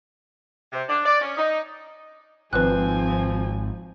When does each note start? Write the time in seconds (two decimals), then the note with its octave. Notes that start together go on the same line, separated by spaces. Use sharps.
0.72 C3
0.88 D4
1.05 D5
1.21 C#4
1.36 D#4
2.53 G#1 F3 C4 B4 G#5 F#6